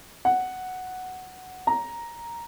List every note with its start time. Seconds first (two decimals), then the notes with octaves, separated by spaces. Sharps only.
0.25 F#5
1.67 A#5